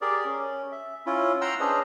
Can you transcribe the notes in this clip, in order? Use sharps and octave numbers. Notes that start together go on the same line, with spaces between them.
G4 G#4 A#4 D5
C#4
E5
C#4 E4 F4
F#5 G5 A#5 C6 E6 F6
C#4 D4 G#4 B4 C5 D#5